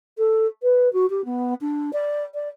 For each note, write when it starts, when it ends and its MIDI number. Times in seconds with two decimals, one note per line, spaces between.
0.18 0.46 69
0.63 0.92 71
0.93 1.06 66
1.10 1.25 67
1.25 1.54 59
1.61 1.90 62
1.93 2.24 74
2.34 2.49 74